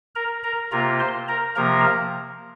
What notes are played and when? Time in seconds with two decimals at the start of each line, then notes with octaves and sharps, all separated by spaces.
0.15 A#4 A#5
0.44 A#4 A#5
0.71 C3 A#3 F4 A#4 A#5
1.00 C5 C6
1.28 A#4 A#5
1.56 C3 F3 A#3 A#4 A#5